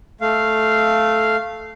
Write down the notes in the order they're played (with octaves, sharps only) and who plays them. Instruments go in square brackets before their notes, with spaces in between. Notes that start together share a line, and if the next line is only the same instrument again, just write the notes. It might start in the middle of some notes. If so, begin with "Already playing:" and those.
[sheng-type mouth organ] A3 F5